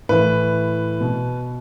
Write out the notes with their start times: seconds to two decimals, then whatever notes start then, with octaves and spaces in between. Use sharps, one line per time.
0.09 A2 E3 B4
1.01 B2